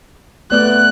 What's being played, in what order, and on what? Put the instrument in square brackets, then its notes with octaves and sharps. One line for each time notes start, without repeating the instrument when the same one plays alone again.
[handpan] A3 B3 D5 [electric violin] F#6